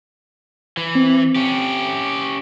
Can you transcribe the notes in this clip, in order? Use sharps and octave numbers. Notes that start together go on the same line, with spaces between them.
E3
C4
C#4 G4